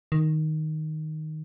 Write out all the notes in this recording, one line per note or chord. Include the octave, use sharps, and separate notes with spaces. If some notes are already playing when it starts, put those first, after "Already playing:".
D#3